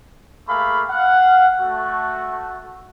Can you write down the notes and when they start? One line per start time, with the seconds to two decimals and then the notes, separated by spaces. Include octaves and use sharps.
0.48 A3 A#3 G#4 F5 B5
0.90 F5 F#5
1.60 A3 F#4